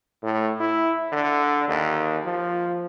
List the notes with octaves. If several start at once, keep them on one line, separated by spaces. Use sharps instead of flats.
A2
E4
D3
D#2
F3